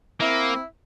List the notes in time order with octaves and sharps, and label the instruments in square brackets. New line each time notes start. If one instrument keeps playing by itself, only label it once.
[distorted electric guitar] A#3 [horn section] C4 E4